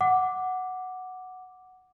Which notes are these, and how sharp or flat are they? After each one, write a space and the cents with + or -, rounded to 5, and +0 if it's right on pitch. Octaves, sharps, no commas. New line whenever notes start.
F#5 +0 D6 +0